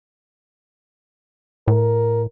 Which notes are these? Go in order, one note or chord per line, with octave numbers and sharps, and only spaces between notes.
A2 A#4